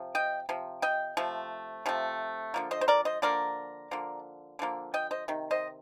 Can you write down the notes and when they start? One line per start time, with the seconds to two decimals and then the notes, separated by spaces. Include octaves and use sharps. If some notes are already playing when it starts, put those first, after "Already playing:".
Already playing: C3 F3
0.15 D#5 G5
0.49 C3 F3
0.82 D#5 G5
1.17 C3 F3 A3
1.86 C3 F3 A3
2.54 D3 F3 A#3
2.71 C5 D#5
2.81 C5
2.88 A#4 D5
3.05 C5 D#5
3.22 D3 F3 A#3 A#4 D5
3.91 D3 F3 A#3
4.59 D3 F3 A#3
4.94 D#5 G5
5.11 C5 D#5
5.28 C3 D#3
5.51 C5 D#5